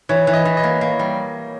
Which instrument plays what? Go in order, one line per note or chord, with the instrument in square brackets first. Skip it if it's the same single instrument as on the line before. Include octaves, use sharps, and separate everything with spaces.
[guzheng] E3 [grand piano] C#5
[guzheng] E3
[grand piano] D#5
[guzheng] E3
[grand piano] D#5
[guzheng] A#3
A#3
G3